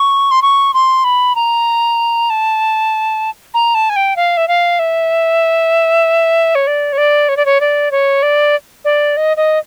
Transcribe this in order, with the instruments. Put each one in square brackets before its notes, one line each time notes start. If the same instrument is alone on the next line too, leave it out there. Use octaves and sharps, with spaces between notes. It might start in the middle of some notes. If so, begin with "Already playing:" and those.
Already playing: [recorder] C#6
C6
C#6
C6
B5
A#5
A5
A#5
A5
G#5
G5
F5
E5
F5
E5
C#5
D5
C#5
D5
C#5
D5
C#5
D5
C#5
D5
D5
D#5
D#5